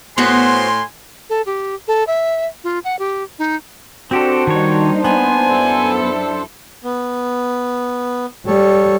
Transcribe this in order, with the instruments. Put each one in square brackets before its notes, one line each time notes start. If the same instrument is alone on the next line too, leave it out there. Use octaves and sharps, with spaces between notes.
[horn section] A2 G#5 C6 [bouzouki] B3 F#4 C5
[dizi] A4
G4
A4
E5
F4
F#5
G4
D#4
[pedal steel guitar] C4 G4 A4 [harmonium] D4 C5 [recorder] F#4
[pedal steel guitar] D#3 C#5 [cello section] G3 A#3 D#4
[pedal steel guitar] B3 [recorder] G#5
[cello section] F#2 E4 A4
[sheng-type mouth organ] B3
[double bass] G3 [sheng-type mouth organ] A4 C#5